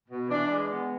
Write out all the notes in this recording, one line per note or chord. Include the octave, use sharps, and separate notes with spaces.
B2
E3 D4
G#3
B3